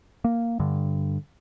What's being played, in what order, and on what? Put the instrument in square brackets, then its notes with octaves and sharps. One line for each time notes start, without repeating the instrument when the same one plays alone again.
[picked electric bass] A#3
G2 D3